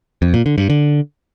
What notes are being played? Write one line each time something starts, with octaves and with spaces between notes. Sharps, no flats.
F2
A#2
D3
G2
D3